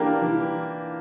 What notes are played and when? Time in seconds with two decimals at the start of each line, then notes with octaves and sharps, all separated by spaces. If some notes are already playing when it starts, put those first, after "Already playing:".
Already playing: E3 A#3 D4 G4 A#4
0.22 E3